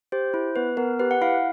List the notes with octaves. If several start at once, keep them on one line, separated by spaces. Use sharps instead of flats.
G4 C5
E4
B3 B4
B3 A#4
G4 B4
F#5
E4 F5